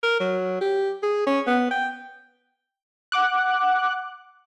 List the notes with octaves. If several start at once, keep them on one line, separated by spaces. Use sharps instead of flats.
A#4
F#3
G4
G#4
C#4
B3
G5
F#5 D6 F#6